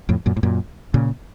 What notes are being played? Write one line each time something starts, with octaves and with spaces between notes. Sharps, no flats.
F2 A2
F#2 A#2
A2
F#2 A#2
A#2 C#3